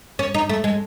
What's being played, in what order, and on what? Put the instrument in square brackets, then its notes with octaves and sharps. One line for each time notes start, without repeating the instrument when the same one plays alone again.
[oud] C#4
D#4
A3
G#3